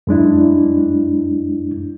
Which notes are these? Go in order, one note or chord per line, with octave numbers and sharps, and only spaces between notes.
F#2 G#3 D4 E4